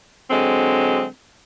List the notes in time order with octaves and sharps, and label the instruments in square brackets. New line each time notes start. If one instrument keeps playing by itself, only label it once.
[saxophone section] D3 F#3 G#3 C4